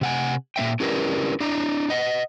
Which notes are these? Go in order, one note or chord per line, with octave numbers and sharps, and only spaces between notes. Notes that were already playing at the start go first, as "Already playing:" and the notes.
C3 F#5 G#5
A#2 B3 E5 G5
C#4 D4 E4 G4 A#4 B4
D4 E4 A#5
D#5 F#5